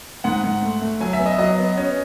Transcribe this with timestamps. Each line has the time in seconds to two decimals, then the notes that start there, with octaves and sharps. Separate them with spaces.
0.24 G#2 F#5
0.44 G#2
0.62 A3
0.81 A3
1.00 F#3 G#5
1.13 E5
1.19 B3
1.26 D#5
1.39 F#3 D#5
1.58 B3
1.77 C#4